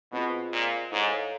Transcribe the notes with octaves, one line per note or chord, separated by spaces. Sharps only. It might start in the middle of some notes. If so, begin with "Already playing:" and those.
B2 C4 F4 G#4 C5 D#5
A#2
G#2 E4 A4 C#5 F5